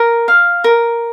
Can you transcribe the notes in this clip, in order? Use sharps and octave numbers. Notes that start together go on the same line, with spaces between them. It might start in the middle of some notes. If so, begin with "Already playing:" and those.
Already playing: A#4
F5
A#4